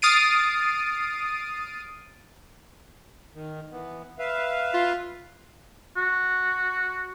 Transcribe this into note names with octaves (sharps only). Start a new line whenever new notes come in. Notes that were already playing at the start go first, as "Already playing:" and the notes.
D#6 F6 A6 C7 D7 D#7
D#3
E3 B3
B4 E5 F5
F4
F#4